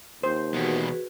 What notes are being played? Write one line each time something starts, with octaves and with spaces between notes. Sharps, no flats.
D#2 C5
E2 B2 F#4 G#4 B4